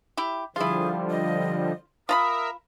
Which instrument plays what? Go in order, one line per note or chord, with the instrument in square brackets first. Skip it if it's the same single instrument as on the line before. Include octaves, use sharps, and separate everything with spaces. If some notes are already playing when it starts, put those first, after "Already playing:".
[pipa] E4 G4
[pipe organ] D3 F3 G3 [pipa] E4 F4 [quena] G#4
[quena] D#5
[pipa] F4 A#5 B5 [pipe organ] A#4 E5 [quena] D#6